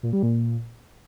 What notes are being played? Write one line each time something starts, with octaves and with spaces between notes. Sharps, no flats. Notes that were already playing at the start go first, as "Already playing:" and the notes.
A#2
G3
A#2